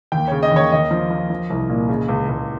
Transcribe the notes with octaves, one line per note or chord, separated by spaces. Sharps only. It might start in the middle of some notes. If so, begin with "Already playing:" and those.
D#2 G5
C#3 C#5
D#5
D#2 C#5
D#2 D#5
F3
F3
F3
C2
A#2
C#3
C#2
C#2